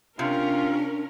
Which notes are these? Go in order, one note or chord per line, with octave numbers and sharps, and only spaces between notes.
C3 C#4 D4 F4 A#4